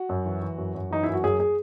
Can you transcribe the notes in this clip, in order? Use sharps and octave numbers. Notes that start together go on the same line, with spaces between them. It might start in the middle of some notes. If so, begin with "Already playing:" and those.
Already playing: F#4
F#2
E3
E3
F#2
F#2
E3 D#4
F#2 E4
F#4
F#2 G#4
G#4